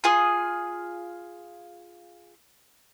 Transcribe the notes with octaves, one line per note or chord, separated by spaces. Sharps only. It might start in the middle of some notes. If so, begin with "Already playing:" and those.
F4 G#4 D#6